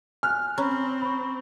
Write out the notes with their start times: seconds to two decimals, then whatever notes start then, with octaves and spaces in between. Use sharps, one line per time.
0.23 G#5 F6 F#6
0.58 C4 C#4 A#5 B5
1.02 B5 C#6